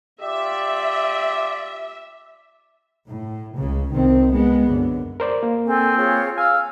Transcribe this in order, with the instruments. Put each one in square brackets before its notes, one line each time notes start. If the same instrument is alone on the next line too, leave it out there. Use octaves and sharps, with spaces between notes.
[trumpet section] F4 G4 D5 [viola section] E5
[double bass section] A2
C#2 C#3
C2 D#3 C4
G#3 B3
F#2 D3
[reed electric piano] A#4 C5 D5
A#3
[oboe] C4 [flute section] A4 G#5
[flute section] F4 G#4 C#5
[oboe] F5 [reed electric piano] G#5 [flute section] E6 F6